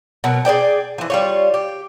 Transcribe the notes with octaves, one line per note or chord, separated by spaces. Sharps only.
B2 F#3 A#4
G#4 C#5 D5 G5
E3 F3
G3 F4 C#5
G4